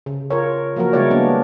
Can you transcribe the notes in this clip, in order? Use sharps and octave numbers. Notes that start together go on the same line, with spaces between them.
C#3
F4 A#4 C#5
F3 F#3 A#3 F#4 A#4
C#3 G3 G#3 E4 C#5 D5
A#3 B3 D4